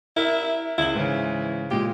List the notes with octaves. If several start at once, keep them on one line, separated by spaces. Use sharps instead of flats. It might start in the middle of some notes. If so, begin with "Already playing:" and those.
E4 A#4 E5
C#2 E4 F#7
G#2 C#3 E3
A#2 G#3 G4